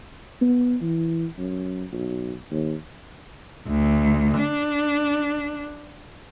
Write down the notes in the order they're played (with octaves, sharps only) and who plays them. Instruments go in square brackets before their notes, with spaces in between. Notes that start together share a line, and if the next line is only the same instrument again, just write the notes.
[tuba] B3
E3
F#2
B1
D#2
[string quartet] D2
D4